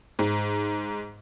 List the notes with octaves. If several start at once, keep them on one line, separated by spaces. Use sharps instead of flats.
G#2